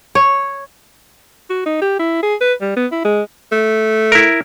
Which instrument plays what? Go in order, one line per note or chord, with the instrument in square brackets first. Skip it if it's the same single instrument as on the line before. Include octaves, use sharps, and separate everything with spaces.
[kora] C#5
[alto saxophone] F#4
D#4
G4
E4
G#4
B4
G3
B3
E4
G#3
A3
[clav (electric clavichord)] E4 A#4